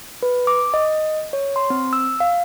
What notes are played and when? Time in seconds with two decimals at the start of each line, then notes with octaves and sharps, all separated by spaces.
0.23 B4
0.47 D6
0.74 D#5
1.33 C#5
1.56 C6
1.70 C4
1.93 E6
2.20 F5